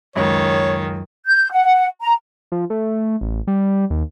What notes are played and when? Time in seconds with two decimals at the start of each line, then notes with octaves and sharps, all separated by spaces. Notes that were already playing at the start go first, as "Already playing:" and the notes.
0.16 C#2 F#2 D#3 C#5
1.26 G6
1.51 F#5
2.01 A#5
2.52 F3
2.70 A3
3.21 A1
3.47 G3
3.90 D#2